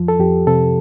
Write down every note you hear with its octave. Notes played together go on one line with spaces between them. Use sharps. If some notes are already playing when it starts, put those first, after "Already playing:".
Already playing: F2 F3
A4
F2 G4
C3 A4